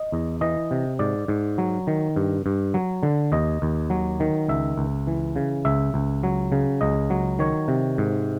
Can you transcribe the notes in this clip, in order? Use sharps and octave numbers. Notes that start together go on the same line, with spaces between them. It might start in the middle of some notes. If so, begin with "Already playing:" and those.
Already playing: D#5
E2
E3 D#5
C3
G#2 D5
G#2
F#3
D#3
G2
G2
F#3
D3
D#2 D#5
D#2
F#3
D#3
C#2 E5
C#2
E3
C#3
C#2 E5
C#2
F#3
C#3
C#2 D#5
F#3
D#3 C#5
C3
G#2